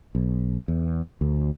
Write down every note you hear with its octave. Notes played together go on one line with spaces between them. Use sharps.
B1
E2
D2